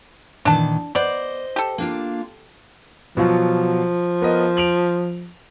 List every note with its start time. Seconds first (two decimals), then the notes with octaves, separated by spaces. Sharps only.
0.45 A#2 D#3 E3 D4 A5
0.95 B3 C5 D5 D#5
1.56 G4 A4
1.78 A#3 D4 F4
3.17 B2 F3 F#3 F4
4.22 B3 A#4 D#5
4.57 D7 F7 F#7